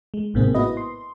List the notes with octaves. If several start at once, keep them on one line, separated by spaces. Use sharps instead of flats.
G#3
A1 G#2 C3 A#3 C4 G#4
B3 E4 F#4 B4 D#5
C6